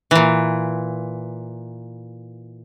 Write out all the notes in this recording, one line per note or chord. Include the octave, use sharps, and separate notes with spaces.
A#2 E3